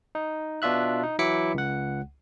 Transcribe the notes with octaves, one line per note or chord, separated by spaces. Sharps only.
D#4
B2 D4 F4 E5 F#6
D#4
E3 F#3 E4 D6 B6 C#7
C#2 F#5